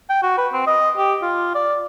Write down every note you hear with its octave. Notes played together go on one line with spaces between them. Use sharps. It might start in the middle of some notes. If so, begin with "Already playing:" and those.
G5
F#4
B4
C4
D#5
G4
F4
D5